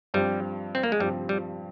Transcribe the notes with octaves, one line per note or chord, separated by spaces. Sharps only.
G2 F3 G3 C4 G4
C4
A#3
G#3
G2 F3 G3 C4 G4
G3